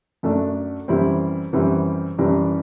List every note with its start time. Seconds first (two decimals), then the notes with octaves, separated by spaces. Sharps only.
0.23 F#2 F#3 A3 D4
0.88 F#2 E3 G3 C4 E4
1.53 F#2 E3 G3 C4 E4
2.18 F#2 E3 G3 D4